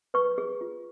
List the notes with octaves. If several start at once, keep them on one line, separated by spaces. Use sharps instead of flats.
B4 C#6
G#4
F4